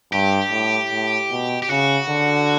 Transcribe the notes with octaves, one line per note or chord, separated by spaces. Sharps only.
G2 G4
A2
A2
B2
G4
C#3 F#4
D3